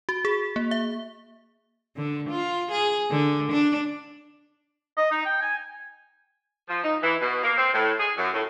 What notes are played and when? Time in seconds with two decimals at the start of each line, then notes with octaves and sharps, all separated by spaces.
0.09 F#4
0.25 G#4
0.56 A#3
0.71 E5
1.96 D3
2.30 F4
2.71 G#4
3.11 D3
3.52 D4
4.97 D#5
5.11 D#4
5.25 G5
5.41 G#5
6.69 F3
6.84 D#4
7.03 E3
7.21 B2
7.43 A#3
7.58 C4
7.74 A2
8.00 G#4
8.18 F#2
8.33 A2